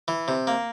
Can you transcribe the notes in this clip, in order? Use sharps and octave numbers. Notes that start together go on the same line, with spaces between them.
E3
C3
A#3